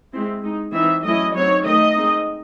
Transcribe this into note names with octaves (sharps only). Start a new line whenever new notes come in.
G#3 C4 E4
G#3 D#4
E3 C4 D#4 E5
F#3 A3 C#4 E4 D#5
F#3 C4 D#4 C#5
D#3 A3 D#4 D#5
G#3 C4 D#4